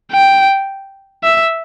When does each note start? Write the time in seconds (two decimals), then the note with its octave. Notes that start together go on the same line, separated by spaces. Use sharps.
0.12 G5
1.23 E5